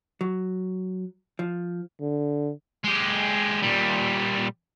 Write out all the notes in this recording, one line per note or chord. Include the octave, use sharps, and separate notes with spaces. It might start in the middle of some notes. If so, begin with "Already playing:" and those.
F#3
F3
D3
G#3 G4
A#2 G3